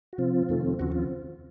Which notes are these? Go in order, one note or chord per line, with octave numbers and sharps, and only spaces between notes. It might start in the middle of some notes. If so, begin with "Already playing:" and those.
F#4
C3 F3 C4 F4
F2 C3 D#3 A3 C4
D#2 C#3 F3 C4 F#4
F4